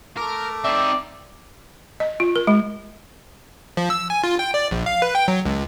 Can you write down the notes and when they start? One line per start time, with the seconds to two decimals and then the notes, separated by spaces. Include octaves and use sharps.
0.17 A3 A#4 D6
0.64 C4 D#4 D5 E5
2.00 D#5
2.20 F4
2.36 A#4
2.47 G#3
3.77 F3
3.90 E6
4.10 G#5
4.24 F4
4.39 G5
4.54 D5
4.71 A#1
4.86 F5
5.02 B4
5.15 G5
5.28 F#3
5.46 C#2